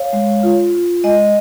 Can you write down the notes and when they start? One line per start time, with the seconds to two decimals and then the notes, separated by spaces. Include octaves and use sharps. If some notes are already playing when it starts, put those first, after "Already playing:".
Already playing: C#5 F5
0.13 G#3
0.43 F4
0.74 F4
1.04 G#3 D#5 G#5